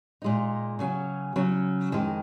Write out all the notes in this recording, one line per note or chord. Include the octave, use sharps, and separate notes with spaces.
A#2 G#3 D#4
C#3 F#3 C#4
C#3 F#3 C#4
F2 D#3 G#3